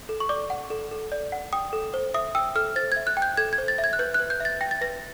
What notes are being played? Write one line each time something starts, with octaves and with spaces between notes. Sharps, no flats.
A4
C#6
D5 D6
F#5
A4
A4
D5
F#5
G5 D#6
A4
C5
E5 D#6
G5 E6
A4 F6
C5 A6
G#6
E5
F#6
G5
G6
A4 G#6
G#6
C5
A6
E5
G#6
F#6
B4 G6
F#6
B4
G6
E5 A6
G5 A#6
A6
B4 A#6